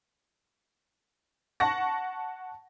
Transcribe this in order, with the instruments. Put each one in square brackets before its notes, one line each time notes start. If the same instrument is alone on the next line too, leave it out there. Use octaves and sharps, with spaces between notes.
[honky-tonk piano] F#5 A5 C#6 A#6